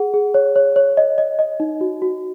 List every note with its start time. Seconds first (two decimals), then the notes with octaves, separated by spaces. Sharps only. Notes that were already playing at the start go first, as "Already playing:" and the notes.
Already playing: G#4 F#5
0.14 G#4
0.34 C#5
0.56 C#5
0.76 C#5
0.97 D#5
1.18 D#5
1.39 D#5
1.60 D#4
1.81 F#4
2.02 F#4